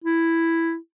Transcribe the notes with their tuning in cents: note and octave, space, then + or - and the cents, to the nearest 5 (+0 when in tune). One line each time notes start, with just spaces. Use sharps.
E4 +5